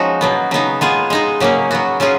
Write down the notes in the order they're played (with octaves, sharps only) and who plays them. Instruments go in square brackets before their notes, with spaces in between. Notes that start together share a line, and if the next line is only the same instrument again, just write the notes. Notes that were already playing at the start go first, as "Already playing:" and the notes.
Already playing: [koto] F3 G#3 C#4 D#4 F#4
B2 F#3 B3
C#3 F#3 B3 D#4
G#3 B3 F4 G#4
G#3 D#4 G#4
C#3 F#3 A#3 C#4
F#3 B3 F#4
F#3 C#4 F4 G#4